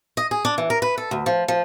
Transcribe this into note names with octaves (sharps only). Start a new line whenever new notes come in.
D#5
G#4
D4
E3
A#4
B4
A4
D2
F3
F3